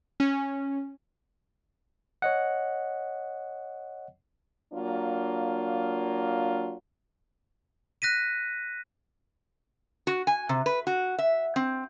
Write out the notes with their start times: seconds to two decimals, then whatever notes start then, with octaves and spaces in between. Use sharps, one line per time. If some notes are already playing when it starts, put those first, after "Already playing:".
0.20 C#4
2.22 C#5 D#5 F#5
4.73 F#3 A#3 D4 F4
8.02 F#6 A#6 B6 D#7
10.07 F#4
10.27 G#5
10.49 C3
10.66 B4
10.87 F#4
11.19 E5
11.56 C4